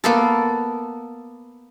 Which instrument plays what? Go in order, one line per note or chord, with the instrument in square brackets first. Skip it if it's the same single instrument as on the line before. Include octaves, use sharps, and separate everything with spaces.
[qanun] A#3 B3 A4